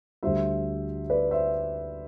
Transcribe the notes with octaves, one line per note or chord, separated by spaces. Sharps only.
D2 D3 G3 C5 E5
B4 D5
C5 E5